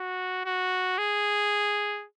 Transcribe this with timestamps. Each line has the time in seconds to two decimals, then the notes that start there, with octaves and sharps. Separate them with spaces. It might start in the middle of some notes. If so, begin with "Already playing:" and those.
Already playing: F#4
0.45 F#4
0.98 G#4